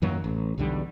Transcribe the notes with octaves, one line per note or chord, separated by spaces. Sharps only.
F#2 D#3 F#3 A#3
A1
B1 E2 D3 G3